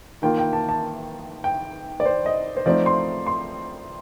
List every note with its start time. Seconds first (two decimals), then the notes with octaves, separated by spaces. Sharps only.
0.22 D#3 A#3 F4 G5
0.38 G5
0.53 A5
0.69 A5
1.44 G5
2.00 D5
2.06 C5
2.26 D#5
2.57 C5
2.66 F3 A3 C4 D#4 D5
2.86 C6
3.27 C6